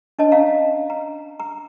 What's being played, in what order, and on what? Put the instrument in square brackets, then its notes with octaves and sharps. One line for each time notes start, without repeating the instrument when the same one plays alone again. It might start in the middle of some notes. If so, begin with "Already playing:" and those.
[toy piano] D4 C#5 D#5 A5
C#4 F5 A#5
A#5
A#5